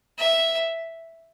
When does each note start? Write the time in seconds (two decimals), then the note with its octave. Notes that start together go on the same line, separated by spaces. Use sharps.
0.19 E5